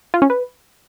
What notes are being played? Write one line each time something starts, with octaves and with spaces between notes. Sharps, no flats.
F4
C#4
B4